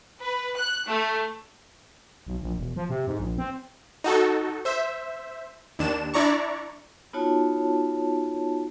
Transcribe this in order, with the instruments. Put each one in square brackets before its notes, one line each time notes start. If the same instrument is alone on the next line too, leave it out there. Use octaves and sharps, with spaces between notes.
[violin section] B4
F#6
A3
[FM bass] B1
A#1
E1
F3
C3
G#2
A#1
C4
[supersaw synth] D#4 F#4 A4
C5 E5
D#2 D4 E7
D4 E4 D5 A#5 C#6
[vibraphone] B3 D#4 F4 F#4 C#5 A5